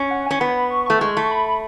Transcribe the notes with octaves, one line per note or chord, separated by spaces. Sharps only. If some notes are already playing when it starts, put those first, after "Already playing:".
Already playing: C#4
F#5
C#4 G#5
B3 B5
C#6
A3 C#6
G#3
A3
B5